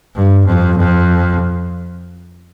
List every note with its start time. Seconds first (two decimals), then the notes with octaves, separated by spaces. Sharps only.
0.15 G2
0.46 F2
0.78 F2